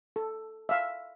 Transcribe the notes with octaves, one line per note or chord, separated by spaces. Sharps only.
A4
E5 F5